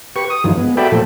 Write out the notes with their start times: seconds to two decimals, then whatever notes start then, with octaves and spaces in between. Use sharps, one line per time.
0.16 G4 B4 C#6
0.30 D#6
0.44 G2 D#3 E3 F#3 G#3 F4
0.57 G#3 B3
0.77 F#4 A4 D5 E5 G5 B5
0.92 A#2 F3 A3 A4